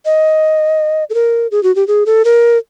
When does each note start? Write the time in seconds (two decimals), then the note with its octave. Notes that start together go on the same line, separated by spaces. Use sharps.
0.05 D#5
1.10 A4
1.14 A#4
1.51 G#4
1.63 F#4
1.75 G4
1.87 G#4
2.06 A4
2.25 A#4